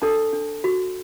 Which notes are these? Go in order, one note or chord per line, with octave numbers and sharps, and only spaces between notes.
D4 A4 A5
D4
F#4